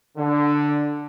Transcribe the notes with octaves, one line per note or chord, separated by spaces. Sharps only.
D3